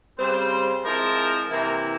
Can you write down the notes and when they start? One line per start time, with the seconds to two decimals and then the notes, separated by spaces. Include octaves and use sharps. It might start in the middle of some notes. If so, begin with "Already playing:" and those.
0.17 C#3 G3 C4 C5
0.83 F3 G#3 C4 E4 A#4
1.49 C3 E3 A#3 E4 A#4